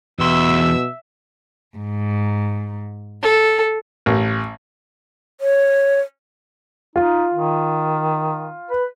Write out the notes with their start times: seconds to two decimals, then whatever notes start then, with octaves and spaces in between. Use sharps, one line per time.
0.19 E2 B2 E5 C6 E6
1.77 G#2
3.22 A4
4.06 A1
5.41 C#5
6.96 D#4 F4
7.33 D#3
8.70 B4